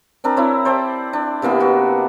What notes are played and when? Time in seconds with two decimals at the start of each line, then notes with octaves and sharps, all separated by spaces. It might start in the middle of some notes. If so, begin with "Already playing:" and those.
0.24 C4 D4 A#4
0.36 C4 E4 C#5
0.65 C5 D5 G5 A5
1.13 D4
1.42 C3 E3 A#3 B3
1.60 F#4